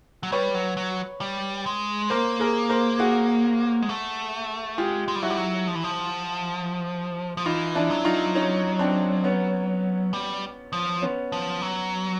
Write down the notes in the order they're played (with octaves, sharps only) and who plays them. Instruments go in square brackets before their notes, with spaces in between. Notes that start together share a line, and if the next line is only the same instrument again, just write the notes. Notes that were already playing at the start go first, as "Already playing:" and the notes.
[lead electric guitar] F#3
[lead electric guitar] G3 [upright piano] B4 C#5
[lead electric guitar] F#3
F#3
G3
G#3
[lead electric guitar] A#3 [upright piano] A#4 C5
[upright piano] G#4 A#4
A#4 C5
F#4 G#4
[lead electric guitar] G#3
A3
[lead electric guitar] G#3 [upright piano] F4 G4
[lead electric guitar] G#3
G3
[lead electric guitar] F#3 [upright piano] E4 F#4
[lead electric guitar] G3
F#3
F3
E3
F3
F3
[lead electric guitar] E3 [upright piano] D#4 F4
[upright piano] D4 E4
[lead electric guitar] F#3
[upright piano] D#4 F4
C#4 D#4
C4 D4
B3 C#4
[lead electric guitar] G3
F3
[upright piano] B3 C#4
[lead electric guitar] F3
F#3